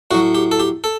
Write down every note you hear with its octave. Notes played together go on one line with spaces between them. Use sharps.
A2 F#3 F#4
G4
A4
G4
A4